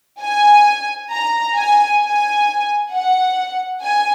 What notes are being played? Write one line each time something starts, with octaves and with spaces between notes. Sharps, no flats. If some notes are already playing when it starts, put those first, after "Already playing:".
G#5
A#5
G#5
G#5
F#5
G#5